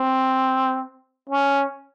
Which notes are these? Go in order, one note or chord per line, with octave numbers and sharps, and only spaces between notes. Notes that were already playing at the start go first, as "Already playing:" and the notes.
Already playing: C4
C#4